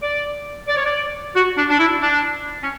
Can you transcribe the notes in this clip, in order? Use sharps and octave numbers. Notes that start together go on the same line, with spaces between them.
D5
D5
C#5
D5
F#4
D4
D4
E4
D4
C#4